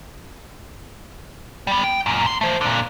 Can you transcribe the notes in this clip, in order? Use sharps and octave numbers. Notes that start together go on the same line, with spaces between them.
G3 B3
G5
F#2 A#2
F#2 C6
A3 C5
A#2 D3